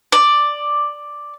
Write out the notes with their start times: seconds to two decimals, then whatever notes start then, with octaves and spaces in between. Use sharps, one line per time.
0.12 D5